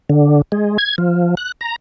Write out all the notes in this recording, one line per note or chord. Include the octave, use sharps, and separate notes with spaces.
D3
G#3
G#6
F3
F#6
A#5